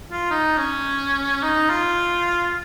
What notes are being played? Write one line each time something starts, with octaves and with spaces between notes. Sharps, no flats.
F4
D#4
C#4
D#4
F4